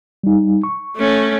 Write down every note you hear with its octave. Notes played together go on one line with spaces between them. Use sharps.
G3 D#4
C#6
A3 C#4